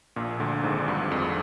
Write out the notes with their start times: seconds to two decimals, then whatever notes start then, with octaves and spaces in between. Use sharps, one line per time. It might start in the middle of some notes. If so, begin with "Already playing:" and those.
0.16 A#1 A#2
0.40 D2 D3
0.63 G#1 G#2
0.88 G2
1.11 F2